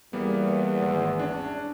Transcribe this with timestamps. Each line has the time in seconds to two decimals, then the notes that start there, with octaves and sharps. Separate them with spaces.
0.13 E2 G3 A#3 B3
0.82 G#1
1.19 C#4 D4